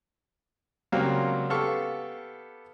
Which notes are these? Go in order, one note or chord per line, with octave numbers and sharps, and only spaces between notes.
C#2 F#3 G3 A#3 C4 F5
B3 G4 A4 F5 C#6